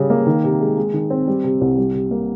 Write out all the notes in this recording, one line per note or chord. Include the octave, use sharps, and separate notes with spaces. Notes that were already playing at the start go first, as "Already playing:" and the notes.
Already playing: C#3 G3
A#3
D#3
C3
G#3
G#3
D#3
C4
G3
C3
C2
G3
C3
A#3